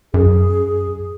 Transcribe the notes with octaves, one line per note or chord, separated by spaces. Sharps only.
F#2 G#4